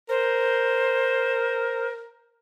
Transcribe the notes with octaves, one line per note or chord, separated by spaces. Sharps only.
A#4 C5